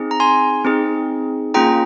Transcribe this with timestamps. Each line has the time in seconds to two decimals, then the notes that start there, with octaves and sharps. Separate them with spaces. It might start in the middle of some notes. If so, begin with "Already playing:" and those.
Already playing: C4 D#4 G#4
0.11 A#5
0.20 G#5 C6
0.65 C4 D#4 G#4
1.54 A#3 C#4 F4 G#4 G5 A#5